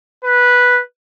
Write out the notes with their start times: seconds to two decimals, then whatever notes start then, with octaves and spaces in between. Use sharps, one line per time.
0.25 B4